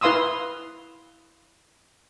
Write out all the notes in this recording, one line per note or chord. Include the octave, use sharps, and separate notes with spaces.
E4 B4 F5 C6 D#6 E6